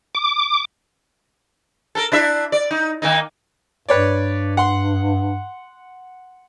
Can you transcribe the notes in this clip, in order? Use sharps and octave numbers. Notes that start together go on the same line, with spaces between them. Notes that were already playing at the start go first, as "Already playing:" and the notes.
D6
A4 A#4
D4 E4 E5
D5
D#4
D#3 A#3 D#4
G2 B4 C#5 D5
F#5 C6